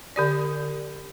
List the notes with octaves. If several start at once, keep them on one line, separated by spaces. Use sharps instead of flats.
D3 G4 D5